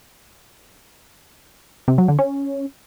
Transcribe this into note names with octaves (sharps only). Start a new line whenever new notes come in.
C3
F#3
D3
C#4